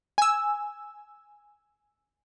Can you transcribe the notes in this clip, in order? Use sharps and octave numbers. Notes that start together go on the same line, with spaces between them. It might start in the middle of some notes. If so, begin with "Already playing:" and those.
G#5 E6